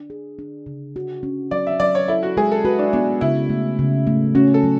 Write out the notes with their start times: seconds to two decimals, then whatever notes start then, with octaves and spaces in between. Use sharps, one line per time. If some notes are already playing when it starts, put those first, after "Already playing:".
Already playing: D4
0.10 G#4
0.39 D4
0.66 C#3
0.96 F#4
1.23 C#4
1.51 F#3 D5
1.67 E5
1.80 F#3 D5
1.95 C#5
2.08 E4 A4
2.23 F#4
2.37 G#3 G#4
2.52 A4
2.65 F#4 B4
2.79 D4
2.93 B3 D4
3.21 C#3 E4
3.50 A3
3.79 C#3
4.07 A3
4.35 C#4 F#4
4.54 A4
4.63 F#3